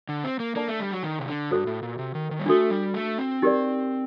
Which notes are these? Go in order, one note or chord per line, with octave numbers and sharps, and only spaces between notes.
D3
C4
A#3
A#3 D4 A4 D5 A5
A3
G3
F#3
D#3
C3
D3
G2 F#4 A4 C5
A2
A#2
C3
D#3
D#3
G3
A3 D4 F#4 A4
G3
A3
C4
D#4 G4 A#4 D5